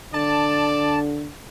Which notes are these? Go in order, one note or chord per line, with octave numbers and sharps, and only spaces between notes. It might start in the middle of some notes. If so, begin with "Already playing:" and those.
D3 D5 A5